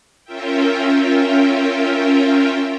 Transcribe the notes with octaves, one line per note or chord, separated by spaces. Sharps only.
C#4 F4 A#4 E5 G5